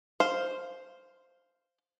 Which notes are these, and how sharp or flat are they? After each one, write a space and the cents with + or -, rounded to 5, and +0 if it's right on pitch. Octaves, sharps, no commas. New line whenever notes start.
C5 +0 F5 +0